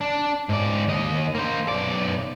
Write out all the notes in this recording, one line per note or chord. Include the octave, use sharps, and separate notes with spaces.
D4
G#2 D5
D#2 D#5
A#3 C5
B1 D5